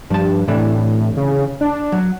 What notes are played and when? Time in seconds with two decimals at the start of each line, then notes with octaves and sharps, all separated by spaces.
0.10 G2 F3 A5
0.48 A2 C3 E3 D4
1.17 C#3
1.61 D4
1.92 F#3